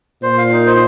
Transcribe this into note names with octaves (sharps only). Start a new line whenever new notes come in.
A#2 C5
F5
D#4
C5